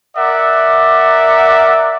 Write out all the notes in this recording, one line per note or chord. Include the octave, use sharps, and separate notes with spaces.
A#4 D5 E5 F#5